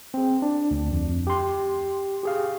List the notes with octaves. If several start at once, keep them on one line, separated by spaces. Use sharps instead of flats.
C4 G#4
D4
D2
F2
G4 C6
G4 G#4 F5